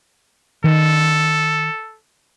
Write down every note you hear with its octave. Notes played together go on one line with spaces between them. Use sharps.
D#3 A4